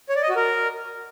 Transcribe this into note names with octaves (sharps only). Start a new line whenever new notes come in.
C#5
D5
D#5
F#4
A#4